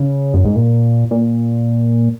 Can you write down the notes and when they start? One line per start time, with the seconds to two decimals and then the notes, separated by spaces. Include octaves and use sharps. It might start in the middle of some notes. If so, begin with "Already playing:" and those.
Already playing: C#3
0.34 F#2
0.45 G#2
0.56 A#2
1.11 A#2